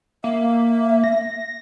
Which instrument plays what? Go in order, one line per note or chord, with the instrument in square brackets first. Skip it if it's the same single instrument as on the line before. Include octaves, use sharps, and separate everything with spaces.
[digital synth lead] A#3 [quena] E5
[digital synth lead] A#6